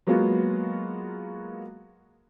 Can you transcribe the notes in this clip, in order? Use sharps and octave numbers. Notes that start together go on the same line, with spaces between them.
F#3 G#3 A#3 B3 F4 F#4